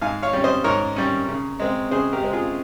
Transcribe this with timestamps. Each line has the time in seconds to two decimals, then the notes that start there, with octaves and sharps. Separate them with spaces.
0.02 G#2 F5 G#5
0.22 C#5 F5
0.33 G3 C#4
0.44 C5 D#5
0.64 G#2 A#4 C#5
0.96 G3 C#4
1.28 C#3
1.60 G#3 C4
1.91 C#3 G#4 C5
2.13 G4 A#4
2.23 G#3 C4
2.33 F4 G#4